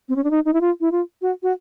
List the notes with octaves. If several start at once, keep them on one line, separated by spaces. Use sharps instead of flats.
C4
C#4
D4
D#4
D#4
E4
F4
E4
F4
F#4
F#4